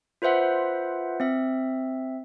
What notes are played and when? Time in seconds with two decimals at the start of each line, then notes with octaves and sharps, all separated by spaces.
0.22 F4 B4 C5 E5 F#5
1.20 C4 E5